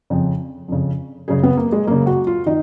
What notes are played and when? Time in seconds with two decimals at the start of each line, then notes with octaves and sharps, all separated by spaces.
0.10 F2 C#3
0.68 F2 C#3
1.28 F#2 C#3 G#4
1.43 B3
1.57 A#3
1.72 G#3
1.87 F#2 C#3 A#3
2.06 F#4
2.27 F4
2.46 D#3 D#4